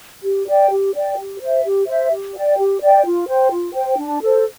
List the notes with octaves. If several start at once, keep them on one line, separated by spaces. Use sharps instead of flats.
G4
D5 G5
G4
D5 G5
G4
C5
E5
G4
C5 E5
G4
D5 G5
G4
D5 G5
F4
C5 G5
F4
C5 G5
D4
A4 C5